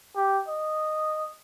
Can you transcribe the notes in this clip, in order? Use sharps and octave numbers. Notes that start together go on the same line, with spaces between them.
G4
D#5